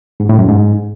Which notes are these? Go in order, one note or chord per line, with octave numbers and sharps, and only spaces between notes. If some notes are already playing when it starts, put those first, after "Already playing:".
G#2
A2
F#2
G#2